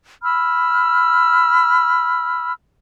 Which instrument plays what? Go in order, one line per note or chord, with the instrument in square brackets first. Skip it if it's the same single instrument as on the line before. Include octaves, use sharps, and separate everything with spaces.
[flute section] B5 E6 F6